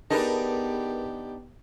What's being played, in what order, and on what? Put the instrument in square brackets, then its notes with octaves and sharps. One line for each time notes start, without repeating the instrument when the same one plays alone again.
[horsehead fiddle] B3 G4 [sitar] D4 D#4 D#5 [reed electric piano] G#4 A#4 B4